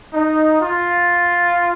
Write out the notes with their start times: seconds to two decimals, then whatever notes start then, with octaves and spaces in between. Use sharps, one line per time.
0.13 D#4
0.60 F4